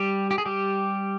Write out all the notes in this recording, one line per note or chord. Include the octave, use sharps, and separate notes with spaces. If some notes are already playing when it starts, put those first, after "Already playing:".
Already playing: G3 G4
G4
G#4
G3 G4